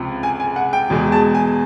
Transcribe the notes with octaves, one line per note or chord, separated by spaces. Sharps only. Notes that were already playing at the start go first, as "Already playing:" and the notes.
Already playing: C#2 C3 F3
G#5
G#5
F#5
G5
E2 B2 G#3
A5
G#5